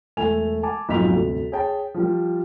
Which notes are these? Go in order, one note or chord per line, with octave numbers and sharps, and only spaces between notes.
E1 A3 G#5 F7
G#5 A5 D6
B1 F2 G#2 F4 B6 F7
G1 D2 C3
G#4 C#5 G5 A5
F3 G3